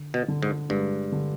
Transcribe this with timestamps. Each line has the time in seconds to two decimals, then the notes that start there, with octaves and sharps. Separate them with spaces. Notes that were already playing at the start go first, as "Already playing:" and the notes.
Already playing: D3
0.14 B2
0.28 D3
0.43 G#2
0.70 G2 G#3
1.12 D3